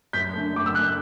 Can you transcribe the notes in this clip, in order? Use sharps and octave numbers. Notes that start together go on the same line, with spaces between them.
F#2 G6 B6
D3 A3
F#2 D6
E6
D3 A3 F#6
G6